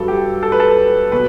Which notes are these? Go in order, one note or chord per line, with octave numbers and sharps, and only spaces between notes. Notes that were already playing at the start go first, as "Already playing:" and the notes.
Already playing: G2 F#3 A4
G4
A4
B4
A4
B2 F#3 B4